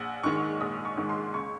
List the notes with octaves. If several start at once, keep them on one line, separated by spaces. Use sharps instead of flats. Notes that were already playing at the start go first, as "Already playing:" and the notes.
Already playing: A#1 F#5
G#2 D#3 G#3 C#6
A#1 D#6
C#6
G#2 D#3 G#3
C6
C#2 C#6